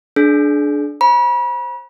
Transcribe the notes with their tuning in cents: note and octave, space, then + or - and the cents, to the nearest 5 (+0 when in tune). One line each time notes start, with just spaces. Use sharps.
D4 +0 G#4 +40
C5 +15 B5 -40